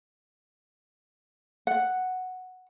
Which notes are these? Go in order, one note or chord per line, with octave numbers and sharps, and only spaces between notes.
F#5